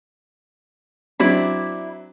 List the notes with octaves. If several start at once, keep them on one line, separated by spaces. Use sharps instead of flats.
F#3 C4 D4 E4 D5 B5